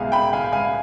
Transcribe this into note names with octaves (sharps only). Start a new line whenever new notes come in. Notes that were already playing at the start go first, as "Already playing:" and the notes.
Already playing: C2 B2 G#3 F5 G#5
G5 B5
F5 G#5
F5 G#5